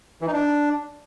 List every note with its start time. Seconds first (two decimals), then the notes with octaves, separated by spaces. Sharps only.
0.22 E3
0.27 D#4
0.33 D4